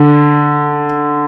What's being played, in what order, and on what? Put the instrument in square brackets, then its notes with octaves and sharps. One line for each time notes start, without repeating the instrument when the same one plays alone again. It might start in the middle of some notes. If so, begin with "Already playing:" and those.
Already playing: [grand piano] D3